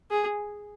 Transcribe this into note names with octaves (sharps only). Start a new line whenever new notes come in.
G#4